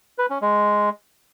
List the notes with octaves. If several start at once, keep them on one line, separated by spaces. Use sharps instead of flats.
B4
C#4
G#3